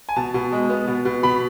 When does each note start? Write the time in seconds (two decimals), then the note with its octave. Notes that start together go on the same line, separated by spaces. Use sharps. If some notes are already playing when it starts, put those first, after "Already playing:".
0.09 G#5
0.16 B2 A5
0.34 B2
0.52 G#3
0.70 B3
0.88 B2
1.05 B2
1.23 B2 B5